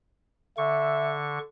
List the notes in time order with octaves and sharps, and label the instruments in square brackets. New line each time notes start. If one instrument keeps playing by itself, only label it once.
[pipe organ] D3 C#6 [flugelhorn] E5